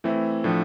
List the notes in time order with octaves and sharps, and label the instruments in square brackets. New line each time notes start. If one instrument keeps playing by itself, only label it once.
[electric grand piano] E3 A3 C4 E4
A2 F3 A3 D4